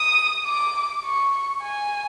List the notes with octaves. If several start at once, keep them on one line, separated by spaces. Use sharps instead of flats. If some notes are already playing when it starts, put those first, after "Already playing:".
Already playing: D#6
D6
C#6
G#5